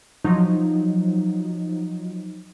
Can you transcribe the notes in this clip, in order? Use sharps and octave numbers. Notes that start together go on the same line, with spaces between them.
F3 F#3 D#4